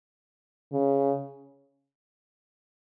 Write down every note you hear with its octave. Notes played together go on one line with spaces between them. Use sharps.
C#3